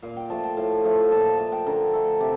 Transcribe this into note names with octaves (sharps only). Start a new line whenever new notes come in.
A#2 F5
G5
F3 A3 A5
G5
A2 F5
F3 A3
A#2 A5
A5
A3 A5
G5
D3 A#4
A3 A4
C3 G4